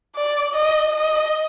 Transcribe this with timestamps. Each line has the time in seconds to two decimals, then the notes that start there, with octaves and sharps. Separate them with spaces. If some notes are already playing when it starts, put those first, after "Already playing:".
0.15 D5
0.54 D#5
0.93 D#5